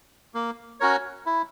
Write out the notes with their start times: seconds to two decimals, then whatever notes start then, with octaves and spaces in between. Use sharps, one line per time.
0.34 A#3
0.80 C#4 F#4 A#4 C#5
1.26 E4